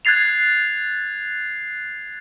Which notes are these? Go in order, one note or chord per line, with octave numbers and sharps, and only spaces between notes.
F#6 G#6 A6 C7 F7